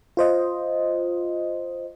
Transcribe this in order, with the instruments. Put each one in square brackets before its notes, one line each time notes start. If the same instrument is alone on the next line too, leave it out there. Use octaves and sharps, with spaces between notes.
[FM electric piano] F4 C5 D#5